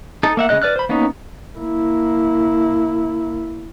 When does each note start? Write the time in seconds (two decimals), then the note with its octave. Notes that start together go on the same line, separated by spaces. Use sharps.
0.23 D#4 A4
0.37 A#3 E5 F#5
0.49 C#3 G#3 D#5 F#6
0.62 B4 D5 F6 F#6
0.76 C5 B5
0.89 A#3 B3 C#4 D#4
1.58 A#3 E4